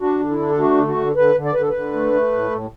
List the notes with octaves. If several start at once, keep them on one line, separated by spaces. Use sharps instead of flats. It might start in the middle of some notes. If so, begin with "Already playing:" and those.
D4 F#4
D3
E4
D4
A4
A3 F#4
D3
F#4
D3
D3 B4
D3
D5
D3 B4
A4
D3 B4
A3
A3
A2
A2